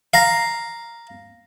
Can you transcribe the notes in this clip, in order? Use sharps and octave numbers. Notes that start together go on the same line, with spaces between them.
F5 A#5